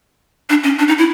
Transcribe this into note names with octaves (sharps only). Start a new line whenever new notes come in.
D4
C#4
D4
D#4
E4